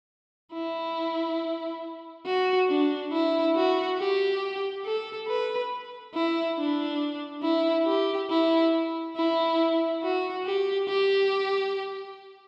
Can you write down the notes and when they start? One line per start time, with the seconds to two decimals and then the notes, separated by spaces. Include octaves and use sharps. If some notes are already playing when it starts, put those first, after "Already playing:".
0.53 E4
2.26 F#4
2.69 D4
3.12 E4
3.56 F#4
3.99 G4
4.85 A4
5.28 B4
6.15 E4
6.58 D4
7.43 E4
7.86 G4
8.30 E4
9.17 E4
10.03 F#4
10.45 G4
10.89 G4